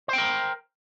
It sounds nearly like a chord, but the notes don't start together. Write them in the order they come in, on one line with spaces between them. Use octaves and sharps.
C5 G5 A#4